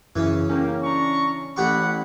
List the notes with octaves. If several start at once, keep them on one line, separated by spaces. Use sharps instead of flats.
F#2 C#3 E3
A#3 C#4 G4
D4 A#5 C#6
A1 G4 F#5 B5 C#6